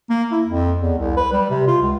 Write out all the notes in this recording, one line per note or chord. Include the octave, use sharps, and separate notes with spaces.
A#3
E4
F2
E2
C2
B4
G3
C3
F4
C#2